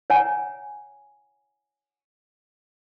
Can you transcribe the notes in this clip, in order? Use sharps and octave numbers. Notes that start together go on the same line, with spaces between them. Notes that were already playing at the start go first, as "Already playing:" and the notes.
C#5 F#5 G#5 A#5